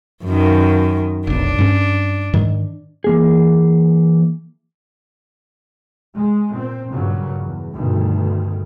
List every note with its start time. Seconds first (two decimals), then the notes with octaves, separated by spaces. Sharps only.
0.25 F#2 D#3
1.27 F1 B1 D4
1.59 G2 C#4
2.33 G#2 D#3
3.04 E3 A#3 G#4
6.12 G#3
6.52 A#2 C4
6.89 G2 A#2 C#3 F#3
7.42 E2
7.75 D2 G2 B2 D#3